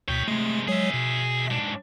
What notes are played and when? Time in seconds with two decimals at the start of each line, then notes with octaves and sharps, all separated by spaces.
0.08 D2 B2 C#5 G5 B6
0.28 C3 G#3 A3
0.68 F#3 G#3 G#4 C#5 E5
0.94 B2
1.50 G#2 D4